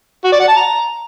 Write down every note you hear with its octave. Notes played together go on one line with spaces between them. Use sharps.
F#4
D5
F#5
A5
A#5